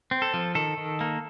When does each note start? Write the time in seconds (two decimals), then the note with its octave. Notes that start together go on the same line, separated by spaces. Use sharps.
0.11 C4
0.22 A4
0.34 F3
0.55 D#3 A4
0.77 D#3
1.01 A#3